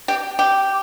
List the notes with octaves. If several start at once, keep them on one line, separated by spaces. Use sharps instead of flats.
G4
G4